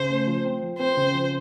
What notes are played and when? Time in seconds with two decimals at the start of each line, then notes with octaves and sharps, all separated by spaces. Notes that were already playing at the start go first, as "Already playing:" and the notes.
Already playing: C#3 C5
0.10 A3
0.27 F3
0.45 C4
0.62 F3
0.79 C4 C5
0.97 C#3
1.13 F3